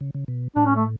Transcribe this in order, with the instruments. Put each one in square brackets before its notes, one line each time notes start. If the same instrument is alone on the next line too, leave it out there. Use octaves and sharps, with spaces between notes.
[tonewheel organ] C#3
C#3
B2
[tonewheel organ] A2 [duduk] D4
[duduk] C#4
A3